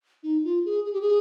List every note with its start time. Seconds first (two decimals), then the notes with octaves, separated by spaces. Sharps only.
0.23 D#4
0.44 F4
0.65 G#4
0.85 G#4
0.93 G4
1.01 G#4